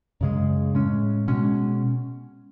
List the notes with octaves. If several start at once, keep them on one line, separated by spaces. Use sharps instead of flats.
F#2 C#3 G#3
A2 G#3 C#4
B2 G#3 C#4